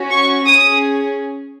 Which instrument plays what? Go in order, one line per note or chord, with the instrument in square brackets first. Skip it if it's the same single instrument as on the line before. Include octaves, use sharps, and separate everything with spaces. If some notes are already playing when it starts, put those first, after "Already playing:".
Already playing: [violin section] C#4 F#4
C#6
C#4 G#4 D#6